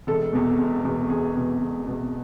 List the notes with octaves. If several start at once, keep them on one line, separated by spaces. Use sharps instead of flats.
E1 A4
E2 B2
E1
E2 B2
E1 G#4
E2 B2
E1
E2 B2